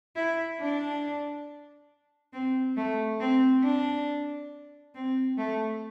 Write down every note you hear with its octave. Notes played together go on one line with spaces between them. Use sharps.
E4
D4
C4
A3
C4
D4
C4
A3